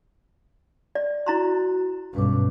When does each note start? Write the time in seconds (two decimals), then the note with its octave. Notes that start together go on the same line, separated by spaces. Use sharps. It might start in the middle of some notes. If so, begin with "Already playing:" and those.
0.95 D5
1.26 E4 F#4 A#5 C6
2.14 B1 G2 C#4 B4 D6